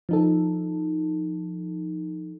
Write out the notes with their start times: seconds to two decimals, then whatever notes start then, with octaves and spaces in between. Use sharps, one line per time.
0.09 F3 D#4 A4